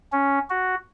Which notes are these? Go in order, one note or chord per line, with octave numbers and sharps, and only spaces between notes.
C#4
F#4